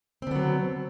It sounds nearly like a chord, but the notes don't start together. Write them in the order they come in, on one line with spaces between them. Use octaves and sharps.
C4 D3 B3 F#3